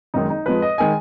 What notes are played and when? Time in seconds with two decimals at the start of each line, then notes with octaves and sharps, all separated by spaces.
0.14 F#1 F#2 D#3 G#3 D#4
0.30 D#4
0.46 F2 F3 G#3 B4
0.62 D#5
0.78 D#3 G#3 G#5